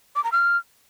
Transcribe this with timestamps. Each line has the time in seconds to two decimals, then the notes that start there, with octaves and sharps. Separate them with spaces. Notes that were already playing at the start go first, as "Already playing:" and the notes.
0.16 D6
0.24 A#5
0.32 F6